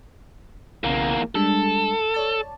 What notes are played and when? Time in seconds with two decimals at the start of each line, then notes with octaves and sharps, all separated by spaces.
0.84 B1 E2 C#3 A#3
1.35 G3 G#3 D4 A4
2.14 C#5 D5 A5